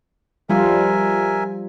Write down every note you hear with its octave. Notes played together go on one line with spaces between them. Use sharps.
F3 G3 F4 A#4 E5 G#5